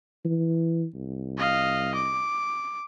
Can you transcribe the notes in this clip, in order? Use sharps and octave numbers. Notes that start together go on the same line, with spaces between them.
E3
C2
D#5 F5
D6